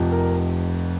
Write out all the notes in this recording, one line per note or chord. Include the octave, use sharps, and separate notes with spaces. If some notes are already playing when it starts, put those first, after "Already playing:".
Already playing: F1 F2 C3
A#4